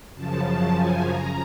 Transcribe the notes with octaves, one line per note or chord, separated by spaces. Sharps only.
F#2 C#3 F3 A5
A5
G#5
A#5